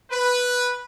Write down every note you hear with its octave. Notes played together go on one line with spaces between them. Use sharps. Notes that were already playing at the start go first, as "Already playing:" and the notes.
B4